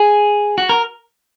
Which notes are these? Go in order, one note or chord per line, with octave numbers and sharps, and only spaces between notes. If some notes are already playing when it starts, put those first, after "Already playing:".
Already playing: G#4
F#4
A#4